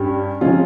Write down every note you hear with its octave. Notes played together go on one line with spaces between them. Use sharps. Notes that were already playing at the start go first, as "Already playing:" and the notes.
Already playing: G2 G3 C#4 G4
C3 F3 G#3 C#4 F4